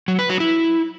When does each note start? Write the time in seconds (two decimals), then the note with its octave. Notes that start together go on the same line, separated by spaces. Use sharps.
0.08 F#3
0.19 B4
0.29 F#3
0.40 E4